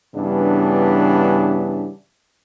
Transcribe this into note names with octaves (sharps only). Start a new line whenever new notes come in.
G2 C#3 E3 B3 D4